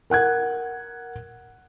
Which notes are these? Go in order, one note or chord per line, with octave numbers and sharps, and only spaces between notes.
A#4 F#5 F#6 G#6